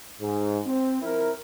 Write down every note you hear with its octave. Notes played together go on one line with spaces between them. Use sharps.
G#2
C4
F3 C4 E4 A#4